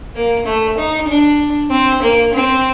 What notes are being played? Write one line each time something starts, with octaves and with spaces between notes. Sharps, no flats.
A#3
A3
D#4
D4
C4
A#3
C4